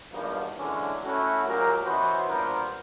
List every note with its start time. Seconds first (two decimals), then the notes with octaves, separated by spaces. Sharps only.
0.12 E2 G2 F3 F#3 A#3 D#4
0.59 D3 E3 F#3 G#3 C#4 D4
1.04 A3 C#4 E4 F#4
1.47 A#2 F#3 G#3 G4 A#4
1.85 B2 E3 B3 C#4 F#4 C5
2.28 G2 A#2 B3 A#4 C5